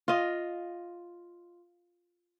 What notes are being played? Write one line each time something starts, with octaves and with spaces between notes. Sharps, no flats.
F4 D#5